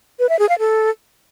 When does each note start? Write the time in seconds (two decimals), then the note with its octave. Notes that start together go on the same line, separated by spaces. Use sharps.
0.19 B4
0.29 E5
0.39 G#4
0.49 F5
0.59 A4